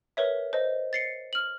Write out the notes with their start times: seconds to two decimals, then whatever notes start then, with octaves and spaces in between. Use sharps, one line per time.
0.17 A#4 B4 C#5 E5
0.53 C5 D#5
0.93 A6 C7 C#7
1.33 F6 F#7